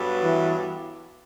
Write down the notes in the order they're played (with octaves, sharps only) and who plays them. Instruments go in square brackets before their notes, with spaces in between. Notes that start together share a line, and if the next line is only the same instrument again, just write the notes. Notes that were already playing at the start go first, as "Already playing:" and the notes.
Already playing: [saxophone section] G2 F#3 B3 F#4 A4
[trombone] E3